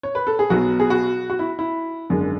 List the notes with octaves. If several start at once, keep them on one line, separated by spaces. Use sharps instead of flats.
C#5
B4
A4
G#4
B1 B2 F#3 B3 F#4
G#4
F#4
F#4
E4
E4
G#1 F#2 D3 G#3